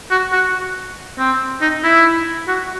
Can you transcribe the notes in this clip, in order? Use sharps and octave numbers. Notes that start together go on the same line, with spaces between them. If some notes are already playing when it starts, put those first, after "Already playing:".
F#4
F#4
C4
D#4
E4
F#4